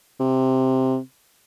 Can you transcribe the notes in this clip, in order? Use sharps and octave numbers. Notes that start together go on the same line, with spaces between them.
C3